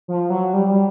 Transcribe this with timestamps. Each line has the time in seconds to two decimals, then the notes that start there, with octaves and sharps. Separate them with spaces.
0.08 F3
0.30 F#3
0.53 G3
0.68 G3